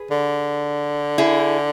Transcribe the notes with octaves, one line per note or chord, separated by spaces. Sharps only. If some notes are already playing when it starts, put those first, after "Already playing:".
Already playing: G#4 B4
D3
E4 G#4